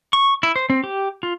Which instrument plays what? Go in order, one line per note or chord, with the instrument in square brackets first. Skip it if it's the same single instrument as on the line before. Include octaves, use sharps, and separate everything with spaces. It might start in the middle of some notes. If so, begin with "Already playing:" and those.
[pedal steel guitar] C#6
E4
C5
C4
G4
F4